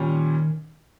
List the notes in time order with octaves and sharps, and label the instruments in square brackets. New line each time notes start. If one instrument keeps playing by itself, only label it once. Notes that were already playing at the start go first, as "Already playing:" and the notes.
Already playing: [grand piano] A#2 G3 C#4 [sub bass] D#3